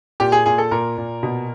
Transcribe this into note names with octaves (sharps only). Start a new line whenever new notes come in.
A#2 G4
G#4
A#2 G#4
A4
A#2 A#4
A#2
B2